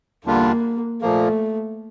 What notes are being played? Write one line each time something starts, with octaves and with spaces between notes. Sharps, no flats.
E2 D3 G3 A#3 D4 F4
A#2 F3 A3 A#3